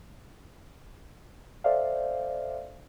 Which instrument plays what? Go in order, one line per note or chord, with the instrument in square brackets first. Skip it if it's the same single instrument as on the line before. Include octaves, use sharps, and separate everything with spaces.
[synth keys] A4 C5 D5 E5 F5